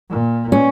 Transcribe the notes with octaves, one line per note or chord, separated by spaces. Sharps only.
A#2
C#4